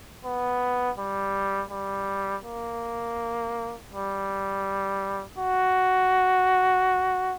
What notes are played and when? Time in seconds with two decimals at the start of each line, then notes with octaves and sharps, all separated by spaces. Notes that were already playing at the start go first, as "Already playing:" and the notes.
0.25 B3
0.98 G3
1.71 G3
2.44 A#3
3.91 G3
5.38 F#4